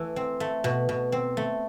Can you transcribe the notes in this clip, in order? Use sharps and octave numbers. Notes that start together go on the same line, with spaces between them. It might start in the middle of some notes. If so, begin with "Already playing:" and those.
Already playing: E3 A3
C4
A3
B2
B2
C4
A3